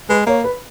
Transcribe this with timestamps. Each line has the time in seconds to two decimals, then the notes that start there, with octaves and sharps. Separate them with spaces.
0.09 G#3 B4
0.26 A#3 C#5
0.44 B4